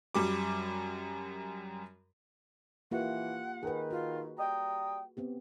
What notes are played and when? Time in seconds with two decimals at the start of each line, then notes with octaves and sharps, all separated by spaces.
0.14 F#2 G3 D6
2.91 E3 A#3 F4 G4 F#5
3.63 D#3 G#4 B4
3.91 F4 F#4
4.38 G3 G5 A#5 D#6
5.17 B3 C4 G4